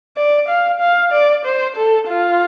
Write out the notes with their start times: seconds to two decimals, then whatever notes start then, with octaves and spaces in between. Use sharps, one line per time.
0.17 D5
0.48 F5
0.80 F5
1.12 D5
1.45 C5
1.77 A4
2.08 F4